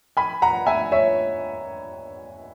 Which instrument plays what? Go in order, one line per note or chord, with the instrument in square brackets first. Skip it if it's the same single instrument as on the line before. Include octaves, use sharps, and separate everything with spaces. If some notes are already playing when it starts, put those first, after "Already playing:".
[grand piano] G#5 B5
F#5 A#5
E5 G#5
C#5 E5